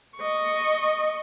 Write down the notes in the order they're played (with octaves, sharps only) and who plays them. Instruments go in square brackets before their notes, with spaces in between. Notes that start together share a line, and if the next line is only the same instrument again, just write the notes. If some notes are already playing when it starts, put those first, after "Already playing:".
[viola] D#5 C#6